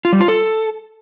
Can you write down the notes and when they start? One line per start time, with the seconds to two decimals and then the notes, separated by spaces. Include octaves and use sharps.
0.05 F4
0.13 G3
0.20 F4
0.28 A4